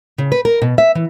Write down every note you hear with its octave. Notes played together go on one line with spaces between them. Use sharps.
C#3
B4
A#4
B2
E5
E3